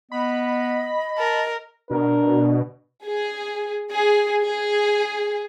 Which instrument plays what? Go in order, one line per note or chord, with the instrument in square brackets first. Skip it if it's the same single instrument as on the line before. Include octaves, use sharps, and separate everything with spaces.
[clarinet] B3 [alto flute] D#5 [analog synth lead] B5
[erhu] A#4 [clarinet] A5
[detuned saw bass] B2 [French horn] D4 [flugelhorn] A#4
[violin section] G#4
G#4
G#4